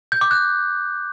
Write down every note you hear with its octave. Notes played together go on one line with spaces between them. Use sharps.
G6
D6
F#6